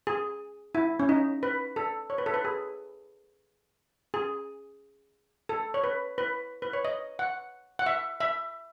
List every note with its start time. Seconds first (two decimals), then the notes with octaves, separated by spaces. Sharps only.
0.07 G#4
0.75 E4
1.00 C#4
1.09 D#4
1.43 B4
1.76 A4
2.10 C#5
2.18 B4
2.26 A4
2.34 B4
2.45 G#4
4.14 G#4
5.49 A4
5.74 C#5
5.84 B4
6.18 B4
6.62 B4
6.73 C#5
6.85 D#5
7.19 F#5
7.79 F#5
7.86 E5
8.20 E5